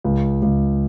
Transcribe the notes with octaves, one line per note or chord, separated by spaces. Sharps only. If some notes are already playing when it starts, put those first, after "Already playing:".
C#2
C#2